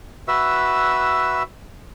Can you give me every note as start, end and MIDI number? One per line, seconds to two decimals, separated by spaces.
0.28 1.43 66
0.28 1.43 71
0.28 1.43 76
0.28 1.43 88